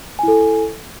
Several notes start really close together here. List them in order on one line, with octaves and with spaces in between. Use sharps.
G#5 E4 A4